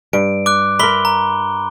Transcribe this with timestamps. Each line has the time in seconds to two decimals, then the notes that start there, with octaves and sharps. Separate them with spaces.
0.13 G2 D7
0.46 D6 F#6
0.79 A#4 E5 B5 C6 G7
1.05 A#5